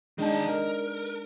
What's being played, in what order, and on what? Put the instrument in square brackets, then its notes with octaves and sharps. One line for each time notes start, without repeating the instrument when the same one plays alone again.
[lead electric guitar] D#3 A5 [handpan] G#3 D4 D#4
[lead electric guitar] A#4